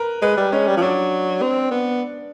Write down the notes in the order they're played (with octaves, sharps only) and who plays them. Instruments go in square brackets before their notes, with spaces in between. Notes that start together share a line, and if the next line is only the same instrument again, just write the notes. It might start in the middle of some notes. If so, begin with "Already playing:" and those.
Already playing: [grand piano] A#4 B4
[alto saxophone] G#3 [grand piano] B4
[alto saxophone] G3
[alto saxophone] G#3 [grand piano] C#4 C#5
[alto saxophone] G3
F3
[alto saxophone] F#3 [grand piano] D4 D5
[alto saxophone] C4
B3